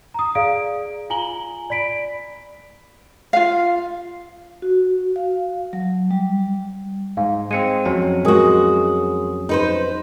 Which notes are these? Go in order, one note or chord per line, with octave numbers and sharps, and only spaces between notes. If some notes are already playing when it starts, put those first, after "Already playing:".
A#5 D#6
G#4 D5 F5 D7
F4 G#5 A#5 F#7 G7
D5 B5 B6 D7
F4 F5
F#4
F5
F#3
G3
G#2 F5
G#3 C4 C#7 D#7
F2 F#3 C#4
G#3 F#4 A#4 D#6
D#4 B4 C5